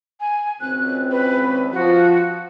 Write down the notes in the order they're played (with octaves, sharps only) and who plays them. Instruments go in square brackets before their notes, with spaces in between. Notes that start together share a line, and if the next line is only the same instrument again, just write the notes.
[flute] G#5
[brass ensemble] G#1 C#2 C4 [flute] F#6
[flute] B4
[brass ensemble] F3 [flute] F#4